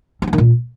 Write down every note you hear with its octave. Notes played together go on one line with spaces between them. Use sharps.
C4
B3
D#3
A#2